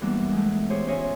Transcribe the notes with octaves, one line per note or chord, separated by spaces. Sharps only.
G#2 E3 G3 A#3 B3 D4
G#3 A3
G4 G#4 C5 C#5
C#4 F4 C#5 D#5 E5 G#5